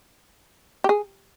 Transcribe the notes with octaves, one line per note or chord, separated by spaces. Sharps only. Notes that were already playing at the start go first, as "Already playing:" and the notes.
G4
G#4